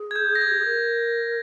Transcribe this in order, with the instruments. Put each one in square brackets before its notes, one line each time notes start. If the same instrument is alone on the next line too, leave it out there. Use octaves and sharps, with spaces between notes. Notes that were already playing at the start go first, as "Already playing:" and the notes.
Already playing: [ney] G#4
[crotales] G#6
G6
A#6
G#6
[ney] G4
G#4
A#4